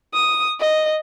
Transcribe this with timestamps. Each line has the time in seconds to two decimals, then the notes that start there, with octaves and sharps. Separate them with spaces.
0.14 D#6
0.60 D#5